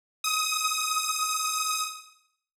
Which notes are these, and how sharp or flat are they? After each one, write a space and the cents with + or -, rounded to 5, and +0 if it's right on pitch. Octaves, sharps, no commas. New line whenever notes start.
D#6 +25